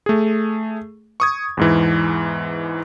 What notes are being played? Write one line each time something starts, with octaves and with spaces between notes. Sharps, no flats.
A3 G#4
C#6 D#6 G#6
E2 G#2 E3